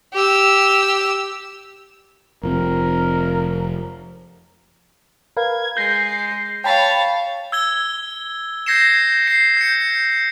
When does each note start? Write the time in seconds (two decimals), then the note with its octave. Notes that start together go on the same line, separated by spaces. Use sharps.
0.14 G4 E6
2.43 F1 F3 C4 A#4
5.37 A#4 B4 F5 G#6
5.77 G#3 G6 A#6 C7
6.64 C#5 F5 G5 A5 B5
7.52 E6 G#6 G7
8.66 G6 G#6 A#6 C7 C#7 E7
9.28 C7
9.57 G6 C7 C#7